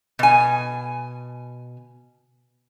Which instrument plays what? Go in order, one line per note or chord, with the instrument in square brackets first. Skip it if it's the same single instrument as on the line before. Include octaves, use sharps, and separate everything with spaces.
[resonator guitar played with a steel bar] B2 G#5